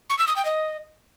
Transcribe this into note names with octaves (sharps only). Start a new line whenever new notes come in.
C#6
E6
D#6
G5
D#5